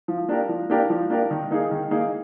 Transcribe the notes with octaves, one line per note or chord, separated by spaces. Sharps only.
F3
A#3 D4 G4 A#4
F3
A#3 D4 G4 A#4
F3
A#3 D4 G4 A#4
D#3
A#3 D#4 G#4
D#3
A#3 D#4 G#4